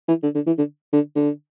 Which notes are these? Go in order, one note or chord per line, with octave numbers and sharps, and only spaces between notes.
E3
D3
D3
E3
D3
D3
D3